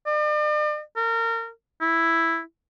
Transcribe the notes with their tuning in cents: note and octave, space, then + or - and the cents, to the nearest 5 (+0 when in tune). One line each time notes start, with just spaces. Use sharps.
D5 +45
A#4 -30
E4 +0